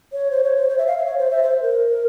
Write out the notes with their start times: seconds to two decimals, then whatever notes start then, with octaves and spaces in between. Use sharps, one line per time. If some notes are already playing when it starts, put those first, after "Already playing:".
0.12 C#5
0.31 C5
0.43 C#5
0.56 C5
0.69 C#5
0.78 E5
0.87 F5
0.97 E5
1.06 C#5
1.18 C5
1.31 E5
1.43 C5
1.62 A#4